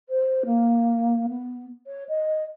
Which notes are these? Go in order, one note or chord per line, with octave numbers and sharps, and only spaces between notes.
C5
A#3
B3
C#5
D#5